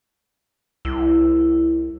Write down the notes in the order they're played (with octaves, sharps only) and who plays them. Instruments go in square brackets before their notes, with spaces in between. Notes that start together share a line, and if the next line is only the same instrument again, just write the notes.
[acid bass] C2 [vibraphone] E4